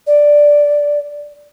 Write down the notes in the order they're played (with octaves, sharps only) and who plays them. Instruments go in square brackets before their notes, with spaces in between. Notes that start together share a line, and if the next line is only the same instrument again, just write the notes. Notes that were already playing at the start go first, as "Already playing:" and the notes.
[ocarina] D5